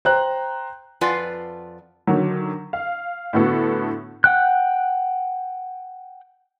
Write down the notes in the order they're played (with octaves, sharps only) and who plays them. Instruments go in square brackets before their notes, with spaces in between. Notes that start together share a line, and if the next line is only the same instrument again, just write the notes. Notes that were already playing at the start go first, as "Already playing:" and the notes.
[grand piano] C5 G5 A#5 F#6
[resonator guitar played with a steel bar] F2 F4 B4 D5 F#5 G#5
[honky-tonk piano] D3 D#3 F#3
F5
A2 D3 A3 B3 F#4 A4
[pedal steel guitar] F#5 G5 F#6